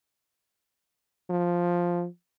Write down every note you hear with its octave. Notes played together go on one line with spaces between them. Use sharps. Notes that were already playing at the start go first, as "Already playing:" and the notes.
F3